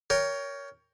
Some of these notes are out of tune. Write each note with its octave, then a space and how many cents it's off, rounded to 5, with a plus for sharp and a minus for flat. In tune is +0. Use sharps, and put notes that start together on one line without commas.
A#4 +0 C#5 +20 G5 +20